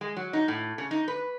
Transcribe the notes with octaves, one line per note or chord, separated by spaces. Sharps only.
G#3
F#3
D#4
A2
C#3
D#4
B4